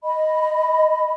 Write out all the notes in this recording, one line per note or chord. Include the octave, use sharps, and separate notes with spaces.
D#5 B5